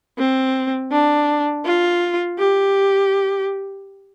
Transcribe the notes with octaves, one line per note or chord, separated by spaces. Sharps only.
C4
D4
F4
G4